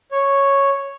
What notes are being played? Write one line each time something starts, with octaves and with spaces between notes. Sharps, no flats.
C#5